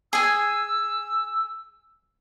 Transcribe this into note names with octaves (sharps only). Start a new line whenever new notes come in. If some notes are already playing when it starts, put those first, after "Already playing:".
G#4 G#5 E6